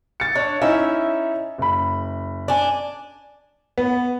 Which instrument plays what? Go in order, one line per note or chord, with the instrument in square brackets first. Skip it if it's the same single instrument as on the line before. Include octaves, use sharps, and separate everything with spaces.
[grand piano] A6 C#7
[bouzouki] D4 [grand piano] C#5
[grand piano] C#4 D#4 E4 [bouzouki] E5
[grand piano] F#1 B5
[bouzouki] D4 G#5
[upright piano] B3